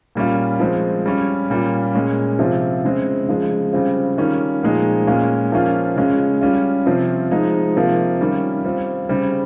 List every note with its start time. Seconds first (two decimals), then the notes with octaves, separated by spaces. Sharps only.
0.15 A#2 G3 C#4 F4
0.60 F3 G#3 C4
1.06 G3 C#4 F4
1.50 A#2 G3 A#3 C#4 F4
1.95 A#2 G#3 C#4
2.39 C3 F3 C4 F4
2.84 C#3 G#3 C4
3.28 C#3 F3 G#3
3.73 C#3 G3 C4 F4
4.18 D#3 G3 C#4 F4
4.63 A#2 F3 G#3 D#4
5.07 A#2 G#3 C#4 F4
5.52 F3 A#3 C#4 F4
5.96 C#3 G#3 C#4 F4
6.41 G3 C#4 F4
6.86 C3 F3 C4 F4
7.31 F3 G#3 D#4
7.76 C3 F3 A#3 F4
8.20 D#3 G3 C#4 F4
8.64 G3 C4 F4
9.09 C#3 G3 C4